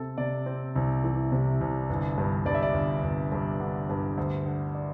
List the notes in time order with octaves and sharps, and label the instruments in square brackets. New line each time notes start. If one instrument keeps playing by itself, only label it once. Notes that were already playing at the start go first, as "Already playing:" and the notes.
Already playing: [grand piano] C3 C4 A4
C3 D5
C4
C2
E3
C3
C2
G1
G2
G2 D5
E5
D5
G1
G1
G2
D3
G2
D2
D3
D5